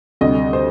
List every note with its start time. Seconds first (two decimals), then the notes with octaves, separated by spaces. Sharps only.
0.21 D2 C3 G3 D#5
0.53 C5